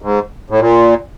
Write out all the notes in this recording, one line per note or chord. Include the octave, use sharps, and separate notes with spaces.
G#2
A2
A#2